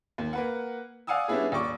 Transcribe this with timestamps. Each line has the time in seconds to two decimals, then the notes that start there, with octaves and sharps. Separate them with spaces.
0.18 D#2
0.33 A#3 B4 F#5
1.07 D5 F5 F#5 G#5 D#6 E6
1.28 G3 B3 C#4 D4 E4 G#4
1.52 D#1 D5 C#6 D6